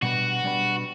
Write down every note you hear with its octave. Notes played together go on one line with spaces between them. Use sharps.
B2 G3 D4 F#4 G4 B4
B2 G3 D4 G4 B4